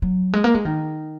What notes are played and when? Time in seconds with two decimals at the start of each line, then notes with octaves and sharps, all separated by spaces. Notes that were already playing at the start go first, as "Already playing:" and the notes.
0.02 F#3
0.34 G#3
0.44 A#3
0.55 G#3
0.65 D#3